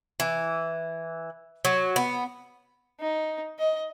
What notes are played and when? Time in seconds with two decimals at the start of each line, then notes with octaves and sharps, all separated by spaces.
0.20 E3
1.65 F#3
1.96 B3
3.00 D#4
3.59 D#5